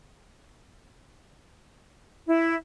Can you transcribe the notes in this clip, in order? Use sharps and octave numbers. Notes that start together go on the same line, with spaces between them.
E4